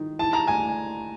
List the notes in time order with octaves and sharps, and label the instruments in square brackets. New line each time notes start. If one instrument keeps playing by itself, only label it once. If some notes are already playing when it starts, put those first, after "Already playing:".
Already playing: [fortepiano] D#3
[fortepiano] E3 [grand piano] A5
[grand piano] A#5
[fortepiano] D2 [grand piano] G#5